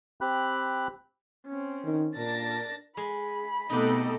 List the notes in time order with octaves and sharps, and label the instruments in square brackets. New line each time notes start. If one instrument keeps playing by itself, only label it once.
[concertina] C4 G4 B5 F#6
[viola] C4 C#4
[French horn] D#3
[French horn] A#2 [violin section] D4 A6 A#6 [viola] A#4
[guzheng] G#3 [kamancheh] B5
[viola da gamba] B2 C4 [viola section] A3 A4 D#5 [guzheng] D#4 G4